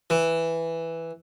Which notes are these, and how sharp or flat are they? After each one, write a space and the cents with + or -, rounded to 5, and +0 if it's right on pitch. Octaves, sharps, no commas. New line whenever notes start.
E3 +0